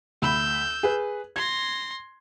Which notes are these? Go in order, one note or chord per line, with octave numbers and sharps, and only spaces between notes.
D2 B5 E6 G6
G#4 B4
C6 G#6 A#6